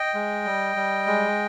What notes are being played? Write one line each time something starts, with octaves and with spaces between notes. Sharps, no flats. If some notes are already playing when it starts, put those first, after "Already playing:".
Already playing: D#5 G5
G#3
G3
G3
G#3